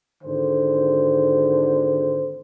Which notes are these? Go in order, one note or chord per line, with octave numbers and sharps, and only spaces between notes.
G#1 D3 C5